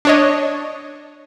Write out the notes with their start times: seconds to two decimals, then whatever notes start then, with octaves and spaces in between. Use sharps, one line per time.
0.05 D4 C#5 D#5